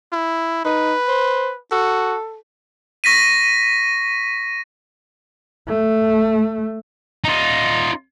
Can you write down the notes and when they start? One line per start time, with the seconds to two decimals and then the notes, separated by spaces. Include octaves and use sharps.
0.13 E4
0.65 D#4 B4
1.08 C5
1.72 F#4 A4
3.04 C#6 A#6 B6 D#7
5.68 A3
7.24 D#4 F4